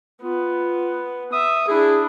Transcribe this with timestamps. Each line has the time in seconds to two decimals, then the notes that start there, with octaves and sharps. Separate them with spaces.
0.23 B3 F4
1.32 E5 D#6
1.68 D4 E4 G#4